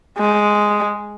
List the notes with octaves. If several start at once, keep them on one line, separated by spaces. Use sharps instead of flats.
G#3